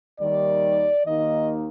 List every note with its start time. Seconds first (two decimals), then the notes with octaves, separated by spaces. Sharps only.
0.19 D#2 D#3 G3 D5
1.05 D#2 D#3 A#3 D#4 D#5